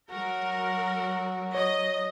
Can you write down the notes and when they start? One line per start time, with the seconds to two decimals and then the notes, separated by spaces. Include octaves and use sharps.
0.11 F#3 F#4 A#4
1.55 C#5 D#5